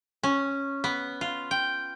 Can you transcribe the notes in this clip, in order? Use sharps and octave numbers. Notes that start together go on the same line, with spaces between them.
C#4
B3
F4
G5